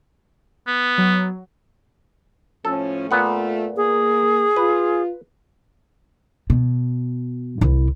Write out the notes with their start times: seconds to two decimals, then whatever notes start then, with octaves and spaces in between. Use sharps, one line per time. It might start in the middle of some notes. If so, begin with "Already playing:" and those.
0.67 B3
0.98 F#3
2.65 A2 F3 C#4 A4
3.11 A#2 A3 B3 F4 F#5
3.76 A#3 G#4
4.56 F4 B4
6.50 B2
7.61 C2 E4